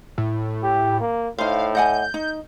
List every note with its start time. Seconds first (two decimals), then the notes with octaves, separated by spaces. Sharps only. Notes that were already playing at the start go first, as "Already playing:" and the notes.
0.18 A2
0.63 G4
1.00 A#3
1.38 A2 D#4 C5 F5
1.75 D#5 F#5 G#5 G6
2.14 D#4